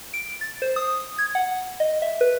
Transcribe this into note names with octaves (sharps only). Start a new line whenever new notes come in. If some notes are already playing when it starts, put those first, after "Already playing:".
D7
A6
C5
D#6
G#6
F#5
D#5
E5
B4